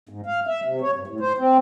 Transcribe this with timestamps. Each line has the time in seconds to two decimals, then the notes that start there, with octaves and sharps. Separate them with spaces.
0.09 G#2
0.26 F5
0.47 E5
0.65 C3
0.81 C#5
0.95 G2
1.07 A2
1.20 C5
1.38 C4